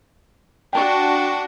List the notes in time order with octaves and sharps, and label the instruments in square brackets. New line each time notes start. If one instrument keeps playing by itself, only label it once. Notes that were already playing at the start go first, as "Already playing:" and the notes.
[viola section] D4 F#4 [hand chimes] G5 A5 C#6